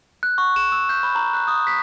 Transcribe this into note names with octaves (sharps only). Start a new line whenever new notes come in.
F#6
C#6
E7
E6
G6
B5
A#5
F#6
D#6
B6